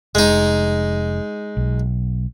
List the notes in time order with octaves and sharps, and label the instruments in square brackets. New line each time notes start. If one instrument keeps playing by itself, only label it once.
[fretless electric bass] F1 [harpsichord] G#3 D#4
[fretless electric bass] B1